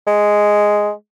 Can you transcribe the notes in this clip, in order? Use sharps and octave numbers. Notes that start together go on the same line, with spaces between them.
G#3